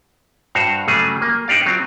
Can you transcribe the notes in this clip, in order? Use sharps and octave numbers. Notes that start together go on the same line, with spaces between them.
G2 F#4 C5 F5
C#3 F#3 G3 A3 G#4
A#3
D4 D#4 G4 D5 F5
F#3 C4 F4